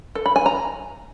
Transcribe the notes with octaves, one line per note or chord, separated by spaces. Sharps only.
A4
B5
G#5
A#5